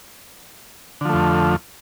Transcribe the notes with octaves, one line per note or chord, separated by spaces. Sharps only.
F2 D3 F3 A3